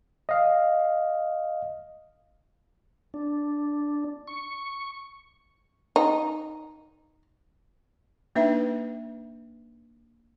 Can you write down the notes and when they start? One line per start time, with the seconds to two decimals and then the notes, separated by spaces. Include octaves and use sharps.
0.29 D#5 F5
3.14 D4
4.27 C#6
5.96 D#4
8.35 A#3 D4 D#4 B4 E5